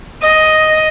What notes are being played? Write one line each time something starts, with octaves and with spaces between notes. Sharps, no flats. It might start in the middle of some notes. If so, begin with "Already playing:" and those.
D#5